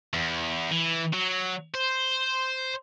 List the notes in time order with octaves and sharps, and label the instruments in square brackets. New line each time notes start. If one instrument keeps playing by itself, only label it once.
[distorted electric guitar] E2
E3
F#3
C5